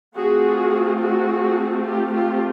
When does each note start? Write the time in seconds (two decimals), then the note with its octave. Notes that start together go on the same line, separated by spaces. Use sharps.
0.16 A3 C4 F4 F#4 G#4
1.01 F#4 G#4
1.85 F4 G4
2.13 F4 G4